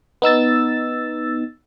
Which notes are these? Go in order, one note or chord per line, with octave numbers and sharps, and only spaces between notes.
B3 D#4 E6 A6